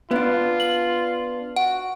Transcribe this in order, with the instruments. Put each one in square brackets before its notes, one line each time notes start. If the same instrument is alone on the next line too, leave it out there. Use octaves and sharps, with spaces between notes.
[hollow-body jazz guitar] B3 D4 [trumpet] F4
[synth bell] F#7
[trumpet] F#4 [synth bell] F#5